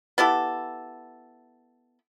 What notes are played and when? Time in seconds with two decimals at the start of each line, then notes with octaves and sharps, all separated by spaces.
0.18 B3 E4 G4 A4